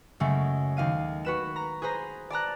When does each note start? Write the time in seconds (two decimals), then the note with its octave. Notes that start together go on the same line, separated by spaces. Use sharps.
0.20 F#2 C#3 G#3 A3
0.77 D#2 F5 D#7
1.25 F#4 B4 E7
1.56 A#5
1.82 G#4 B4 C5 A#5
2.30 D5 A5 A#5 F#6